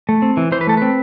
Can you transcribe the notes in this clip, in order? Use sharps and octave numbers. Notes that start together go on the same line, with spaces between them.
A3
C4
E3
E3 C5
B4
A3 A4
C4 B4